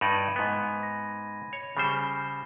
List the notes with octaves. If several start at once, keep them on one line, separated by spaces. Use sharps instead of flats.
G2 D#4 D5 B5 G#6 D#7
G#2 B3
A#6
C#5
C#3 G3 C5 B5 F6